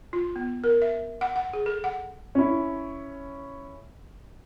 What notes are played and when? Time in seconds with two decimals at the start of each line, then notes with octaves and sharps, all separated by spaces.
0.13 F4
0.36 B3
0.64 A#4
0.82 E5
1.21 F#5
1.36 F#5
1.53 G#4
1.66 A4
1.84 F#5
2.35 C#4 E4